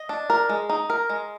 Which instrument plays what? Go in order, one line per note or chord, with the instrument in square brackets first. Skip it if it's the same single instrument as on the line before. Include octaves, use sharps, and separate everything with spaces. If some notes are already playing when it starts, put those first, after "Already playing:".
Already playing: [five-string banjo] D#5
D4
A#4
G#3
D#4
A#4
G#3